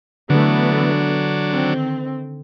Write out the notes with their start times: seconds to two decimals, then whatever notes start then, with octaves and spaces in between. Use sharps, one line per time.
0.30 D3 E3 F#3 A3 B3 D4
1.50 D#3 C4